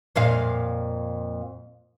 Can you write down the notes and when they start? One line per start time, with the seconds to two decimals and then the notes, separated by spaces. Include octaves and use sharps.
0.16 F2 A#2 F5